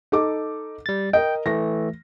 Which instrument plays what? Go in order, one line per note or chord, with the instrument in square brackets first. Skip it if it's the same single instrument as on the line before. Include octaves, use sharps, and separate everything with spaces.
[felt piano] D#4 A4 D6
[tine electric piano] G3 A6
[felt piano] A#4 D#5 [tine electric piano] G5
[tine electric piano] E3 A3 [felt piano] A#6